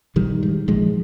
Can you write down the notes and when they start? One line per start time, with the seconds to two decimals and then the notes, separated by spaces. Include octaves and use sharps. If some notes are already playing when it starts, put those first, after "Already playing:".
0.16 A#1 D#3 G3
0.43 G#2
0.68 A#1 F3 G#3